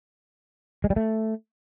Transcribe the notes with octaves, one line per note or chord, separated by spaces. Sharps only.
G#3
G3
A3